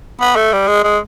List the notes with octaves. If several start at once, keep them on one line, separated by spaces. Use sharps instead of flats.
B3
A3
G3
G#3
G#3